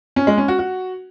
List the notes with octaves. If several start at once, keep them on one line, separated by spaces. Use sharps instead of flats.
C#4
G#3
C#4
F#4
F#4